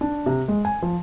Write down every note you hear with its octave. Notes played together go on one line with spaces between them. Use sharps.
D4
C3
G#3
G#5
F3